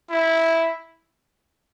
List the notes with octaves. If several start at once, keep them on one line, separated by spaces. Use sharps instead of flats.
E4